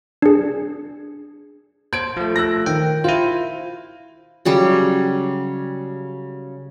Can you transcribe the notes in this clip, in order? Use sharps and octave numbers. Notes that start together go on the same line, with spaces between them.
D4 G#4
C5 G#6 D7
F3 A3
E6 F#6 A#6
D#3 G5
E4 F4 C5
C#3 F#3 G3